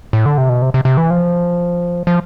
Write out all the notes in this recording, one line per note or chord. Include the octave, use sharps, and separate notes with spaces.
A2
D3
C3
B2
C3
C3
C3
E3
F3
F3